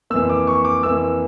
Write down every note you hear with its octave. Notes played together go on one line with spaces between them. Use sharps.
F2 E3 A#3 E6
D6
C#6
D6
F2 E3 A#3 E6